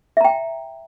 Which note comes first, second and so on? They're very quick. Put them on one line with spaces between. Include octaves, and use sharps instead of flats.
E5 A#5 G5